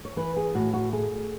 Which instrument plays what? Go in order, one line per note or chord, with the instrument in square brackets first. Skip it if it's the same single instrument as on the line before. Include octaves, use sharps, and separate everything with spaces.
[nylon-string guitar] C#5
E3 B4
G#4
A2 F#4
F#4
A3 G#4